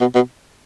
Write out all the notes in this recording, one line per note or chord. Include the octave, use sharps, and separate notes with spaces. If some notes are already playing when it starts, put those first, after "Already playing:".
B2
B2